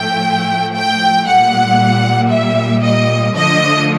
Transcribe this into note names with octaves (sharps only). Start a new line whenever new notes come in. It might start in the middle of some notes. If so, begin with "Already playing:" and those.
Already playing: A2 F3 A3 G5
G5
A#2 G3 F#5
E5
D#5
D3 F3 A3 D#5